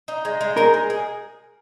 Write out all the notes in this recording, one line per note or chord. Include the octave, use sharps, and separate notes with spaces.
D#4
G#3
G#3
D#4 A#4
G#4
G#4